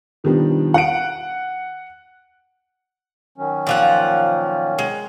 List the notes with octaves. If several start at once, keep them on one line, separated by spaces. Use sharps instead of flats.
B2 D#3 F3 G3 B3 D4
F#5 F#6 D7
D#3 F#3 C#4
A#2 F3 F#5
G#3